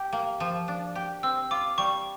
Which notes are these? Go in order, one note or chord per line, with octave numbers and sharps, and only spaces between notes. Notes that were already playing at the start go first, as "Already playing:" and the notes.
Already playing: G4
A#3
F3
D4
G4
C4 E6
F4 D6
G3 C#6